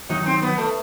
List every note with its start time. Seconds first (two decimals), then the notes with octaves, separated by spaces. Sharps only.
0.09 D#3 F#3 D#4
0.26 C4
0.42 B3
0.58 A3